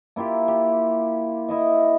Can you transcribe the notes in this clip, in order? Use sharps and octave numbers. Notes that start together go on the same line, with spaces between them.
A#3 E4 F4 G4
G4
E4 D#5 E5